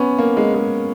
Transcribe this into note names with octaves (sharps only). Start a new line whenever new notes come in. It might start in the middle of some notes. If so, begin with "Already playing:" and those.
Already playing: B3 C#4
A#3
G#3
G#3